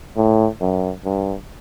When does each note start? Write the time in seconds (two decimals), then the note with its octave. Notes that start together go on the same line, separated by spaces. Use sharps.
0.17 A2
0.61 F#2
1.04 G2